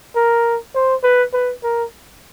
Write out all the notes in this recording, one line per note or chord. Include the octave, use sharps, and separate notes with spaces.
A#4
C5
B4
B4
A#4